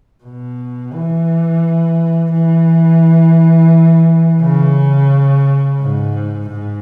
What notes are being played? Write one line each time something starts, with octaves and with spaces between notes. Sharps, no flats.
B2
E3
E3
C#3
G#2
G#2